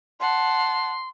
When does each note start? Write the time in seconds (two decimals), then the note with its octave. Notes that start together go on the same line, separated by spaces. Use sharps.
0.20 F#5 A5 C6